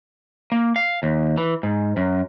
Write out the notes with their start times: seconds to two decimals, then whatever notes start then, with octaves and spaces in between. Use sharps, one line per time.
0.52 A#3
0.76 F5
1.03 D#2
1.38 E3
1.63 G#2
1.97 F#2